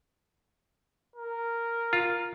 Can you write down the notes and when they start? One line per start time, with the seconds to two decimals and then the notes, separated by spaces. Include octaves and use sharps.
1.16 A#4
1.93 F4